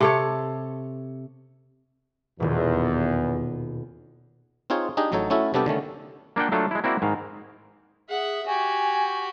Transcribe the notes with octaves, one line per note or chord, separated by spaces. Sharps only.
C3 A4 C#5
D#1 E2 B2
C4 D#4 F4 G#4 C#5
D4 D#4 G4 G#4 D#5
A1 F#3 D#4 A4 C#5
A3 C#4 E4 F#4 A4 E5
C3 G3 B3 D4 G4 A4
D3 D#3 A3 C#4
A#3 D4 F4 F#5 G5
F#3 A3 D4 F4 A4
G#3 E4
A#3 C4 E4 F#4 D5
G#2 D#3 F5
G#4 E5 F#5
F#4 G4 G#5